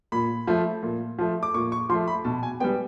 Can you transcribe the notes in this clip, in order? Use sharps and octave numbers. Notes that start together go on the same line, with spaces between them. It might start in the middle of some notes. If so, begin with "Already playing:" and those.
A#2 B5
F3 A3
A#2
F3 A3
D6
A#2 C#6
C#6
F3 A3 C6
B5
B2 A5
G#5
G3 B3 G5